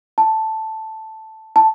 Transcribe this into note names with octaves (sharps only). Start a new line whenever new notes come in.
A5
A5